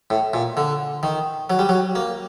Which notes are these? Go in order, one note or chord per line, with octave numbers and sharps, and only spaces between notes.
A2
A#2
D3
D#3
F#3
G3
F#3
A#3